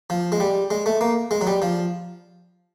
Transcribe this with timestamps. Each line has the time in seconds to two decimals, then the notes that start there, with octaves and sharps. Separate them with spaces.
0.10 F3
0.32 G#3
0.40 G3
0.71 G#3
0.86 A3
1.01 A#3
1.31 G#3
1.41 F#3
1.47 G3
1.62 F3